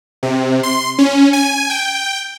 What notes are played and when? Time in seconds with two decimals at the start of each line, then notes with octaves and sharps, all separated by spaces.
0.23 C3
0.63 C6
0.98 C#4
1.33 G#5
1.70 G5